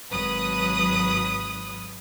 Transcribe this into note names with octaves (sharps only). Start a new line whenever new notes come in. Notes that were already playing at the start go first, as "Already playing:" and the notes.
G#1 F#3 B4 D#6